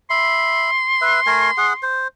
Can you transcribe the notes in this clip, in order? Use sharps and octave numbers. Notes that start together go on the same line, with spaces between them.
E5 B5 C6
B4 E5
A3 A#4 G#5
G#4 F#5
C5